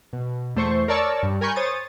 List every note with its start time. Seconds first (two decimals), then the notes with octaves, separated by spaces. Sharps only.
0.13 B2
0.55 E2 A3 C5 C#6
0.88 A#4 C#5 D5 A5 C#6 E6
1.23 G2
1.41 A#4 G#5 B5 C#6 G6
1.56 C5 C#5 D#6 A6